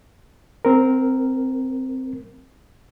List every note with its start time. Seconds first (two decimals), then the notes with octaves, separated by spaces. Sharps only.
0.65 C4 A#4